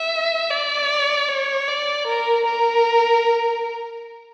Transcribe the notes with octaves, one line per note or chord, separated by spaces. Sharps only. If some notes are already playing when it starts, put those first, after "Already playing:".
Already playing: E5
D5
C#5
D5
A#4
A#4